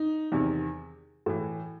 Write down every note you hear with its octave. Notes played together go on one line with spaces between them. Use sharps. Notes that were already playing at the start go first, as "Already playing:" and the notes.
Already playing: D#4
E2 C3 D#3
A2 E3